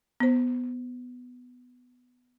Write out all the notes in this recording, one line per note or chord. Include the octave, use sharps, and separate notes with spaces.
B3 C5